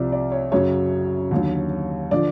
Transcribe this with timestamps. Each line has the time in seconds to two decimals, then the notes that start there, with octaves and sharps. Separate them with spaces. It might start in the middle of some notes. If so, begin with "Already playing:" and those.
Already playing: C2 C3 F3 D5
0.12 D5
0.32 C#5
0.52 F#2 C#3 F#3 C#5
1.31 D#2 D3 F#3
2.11 D3 F3 D5